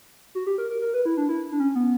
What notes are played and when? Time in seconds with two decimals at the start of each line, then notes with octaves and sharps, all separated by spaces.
0.35 F#4
0.46 G4
0.58 A#4
0.70 A#4
0.82 A#4
0.94 B4
1.05 E4
1.17 D4
1.29 E4
1.52 D4
1.60 C#4
1.75 B3